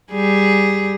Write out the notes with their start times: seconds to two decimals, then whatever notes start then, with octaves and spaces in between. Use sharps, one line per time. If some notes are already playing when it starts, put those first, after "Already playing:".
0.12 G3 G#4